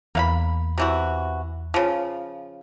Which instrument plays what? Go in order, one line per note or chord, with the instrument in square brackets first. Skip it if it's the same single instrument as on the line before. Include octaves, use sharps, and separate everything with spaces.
[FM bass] E2 [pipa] A#3 F5 B5
[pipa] C3 E3 F#4
C#3 F3